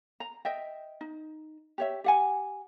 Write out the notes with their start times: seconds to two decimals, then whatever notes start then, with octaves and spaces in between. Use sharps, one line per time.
0.20 A#5
0.45 D#5 E5 G5
1.01 D#4
1.78 G4 C#5 E5
2.04 G4 F#5 G#5